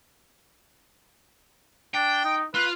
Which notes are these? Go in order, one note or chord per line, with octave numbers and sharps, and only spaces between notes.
D4 G5
D#4
F4 B4